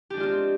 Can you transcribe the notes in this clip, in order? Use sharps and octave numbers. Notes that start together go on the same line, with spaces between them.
G#3 C4 D4 F4 G4